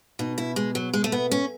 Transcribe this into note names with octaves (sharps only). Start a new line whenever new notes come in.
B2 D#4
E4
G#3
F#3
G#3
A3
B3
C#4